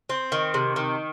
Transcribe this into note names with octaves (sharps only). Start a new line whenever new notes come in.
C4
D#3
C3
D#3